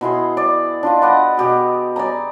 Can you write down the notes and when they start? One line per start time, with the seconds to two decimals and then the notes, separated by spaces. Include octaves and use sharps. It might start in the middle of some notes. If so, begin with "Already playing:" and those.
0.01 B2 E4 G#4 C6
0.37 D5
0.83 D4 F4 D#5
1.02 B4 D5 D#5 F#5
1.37 B2 G4 G#4
1.96 D5 D#5 G#5 A#5